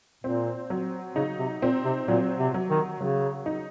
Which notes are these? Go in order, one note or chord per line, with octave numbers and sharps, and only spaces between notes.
A#2 C4
F#3
C#3 D#4
C3
A#2 C4
C3
A#2 F#3
C3
F#3
D#3
C#3 F#3
D#4